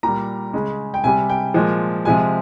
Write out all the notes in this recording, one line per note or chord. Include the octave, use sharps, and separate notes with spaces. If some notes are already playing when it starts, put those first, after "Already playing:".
A#2 G3 A#5
C#3 G#3
G5
C3 G3 G#5
G5
A#2 F3 G#3
C3 F3 G#3 G#5